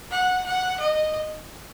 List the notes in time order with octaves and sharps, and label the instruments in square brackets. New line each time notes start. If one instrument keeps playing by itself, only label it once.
[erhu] F#5
F#5
D#5